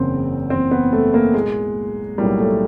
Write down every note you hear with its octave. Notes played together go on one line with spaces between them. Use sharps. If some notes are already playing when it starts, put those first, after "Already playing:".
Already playing: F#1 E2 C#3 C4
F#1 E2 C#3 C4
B3
A3
A#3
B1 A2 F#3 G#3 A#3
B1 A2 F#3 G3 A#3
A3